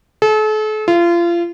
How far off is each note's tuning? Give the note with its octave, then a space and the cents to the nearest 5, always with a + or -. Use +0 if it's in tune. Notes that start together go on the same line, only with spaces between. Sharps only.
A4 -40
F4 -30